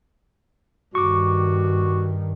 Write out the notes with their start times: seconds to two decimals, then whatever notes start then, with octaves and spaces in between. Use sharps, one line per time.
0.95 G2 D#3 F#4 C#6 D6